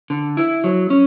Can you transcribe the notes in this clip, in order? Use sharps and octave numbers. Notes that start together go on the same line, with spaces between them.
D3
E4
F#3
C#4